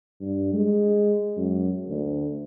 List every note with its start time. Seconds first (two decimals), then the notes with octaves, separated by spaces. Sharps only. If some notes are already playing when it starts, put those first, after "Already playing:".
0.21 G2
0.54 G#3
1.37 F#2
1.88 D2